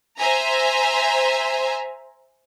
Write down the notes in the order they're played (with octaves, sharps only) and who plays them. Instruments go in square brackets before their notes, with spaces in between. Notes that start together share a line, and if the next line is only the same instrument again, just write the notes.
[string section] C5 E5 G#5 A#5